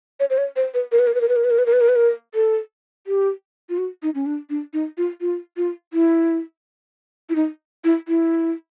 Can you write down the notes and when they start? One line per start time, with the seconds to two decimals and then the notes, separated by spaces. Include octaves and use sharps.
0.20 C#5
0.30 C5
0.38 C#5
0.56 C5
0.74 B4
0.92 A#4
0.99 B4
1.07 A#4
1.15 B4
1.21 A#4
1.29 B4
1.36 A#4
1.44 B4
1.51 A#4
1.58 B4
1.66 A#4
1.73 B4
1.81 A#4
1.89 B4
1.96 A#4
2.35 A4
3.07 G4
3.69 F4
3.78 F#4
4.03 D#4
4.15 C#4
4.26 D4
4.50 D4
4.74 D#4
4.98 F4
5.21 F4
5.57 F4
5.93 E4
7.29 E4
7.36 D#4
7.84 E4
8.08 E4